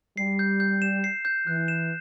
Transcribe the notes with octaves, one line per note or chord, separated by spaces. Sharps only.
G3 C7
G6
G6
E7
C7
G6
E3 F#6
E7